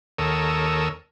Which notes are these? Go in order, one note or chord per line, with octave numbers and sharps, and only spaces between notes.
D#2 A4 A#4 C#5 D#6 E6